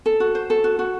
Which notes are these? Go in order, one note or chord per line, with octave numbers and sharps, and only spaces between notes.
A4
F#4
C5
A4
F#4
F#4